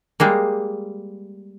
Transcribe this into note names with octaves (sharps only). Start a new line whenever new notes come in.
G3 G#3 A#3